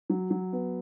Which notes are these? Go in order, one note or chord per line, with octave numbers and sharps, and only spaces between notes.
F#3
F#3
B3